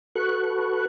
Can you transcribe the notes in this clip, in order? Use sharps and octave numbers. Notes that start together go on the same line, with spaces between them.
F#4 A4 B4 C#6 F#6